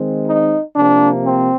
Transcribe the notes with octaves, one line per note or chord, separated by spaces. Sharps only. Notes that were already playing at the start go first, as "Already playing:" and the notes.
Already playing: D#3 G#3 C4
D#4
C3 F3 A#3 D4
C4